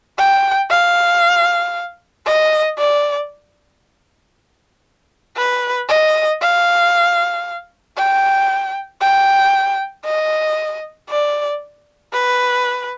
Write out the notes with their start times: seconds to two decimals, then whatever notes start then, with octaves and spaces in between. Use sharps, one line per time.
0.18 G5
0.70 F5
2.26 D#5
2.78 D5
5.37 B4
5.89 D#5
6.42 F5
7.97 G5
9.01 G5
10.05 D#5
11.09 D5
12.14 B4